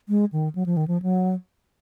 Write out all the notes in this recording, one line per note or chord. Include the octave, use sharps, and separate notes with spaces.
G#3
D#3
F#3
F3
D#3
F3
F#3